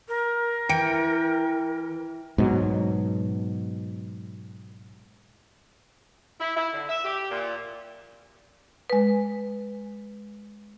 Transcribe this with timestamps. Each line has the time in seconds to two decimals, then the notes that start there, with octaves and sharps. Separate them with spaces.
0.08 A#4
0.69 E3 G5 C#7 D7
2.38 G#2 B2 F#3
6.40 E4
6.57 E4
6.73 D3
6.89 E5
7.05 G4
7.30 A#2
8.90 G#3 B4